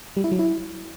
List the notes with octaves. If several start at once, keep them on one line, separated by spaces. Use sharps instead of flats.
G3
E4
F#3
E4